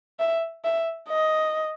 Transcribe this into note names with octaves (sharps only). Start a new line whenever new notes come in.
E5
E5
D#5